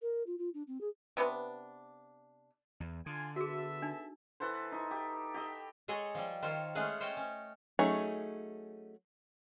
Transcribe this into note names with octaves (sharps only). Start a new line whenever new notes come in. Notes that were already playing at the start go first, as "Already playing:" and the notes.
A#4
F4
F4
D4
C4
G#4
C3 B3 D4 B4
E2
D3 F4 G#5
B3 F#4 G#4 A4 E5
D4 D#4
E3 A4 B4 C5
D#4 C#6
G4
G4 D#5 E5
G#3 G#4 A4 C#5 D#5
F3 G3
D#3 F4 C5 C#5
G#3 A3 C#4 G#4 F5 F#5
C5 C#5 D#5 G5 A5
C#4
F#3 A3 C#4 D#4 G#4